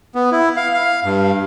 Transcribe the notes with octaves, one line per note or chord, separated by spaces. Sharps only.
B3
E4
F5
F5
G2